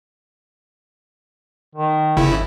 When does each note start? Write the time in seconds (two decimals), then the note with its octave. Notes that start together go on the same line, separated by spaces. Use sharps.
1.75 D#3
2.17 G1 C#3 E4